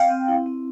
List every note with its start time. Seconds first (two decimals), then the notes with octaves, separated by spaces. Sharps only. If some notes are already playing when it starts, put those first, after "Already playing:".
Already playing: C4 F5 G5
0.10 C4
0.28 E4
0.46 C4